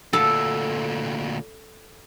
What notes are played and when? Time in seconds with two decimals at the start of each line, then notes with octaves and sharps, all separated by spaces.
0.13 D2 A#2 A4